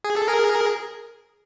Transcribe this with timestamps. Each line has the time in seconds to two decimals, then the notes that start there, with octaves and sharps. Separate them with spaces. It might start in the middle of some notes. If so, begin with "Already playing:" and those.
0.04 G#4
0.16 A4
0.28 G#4 A#4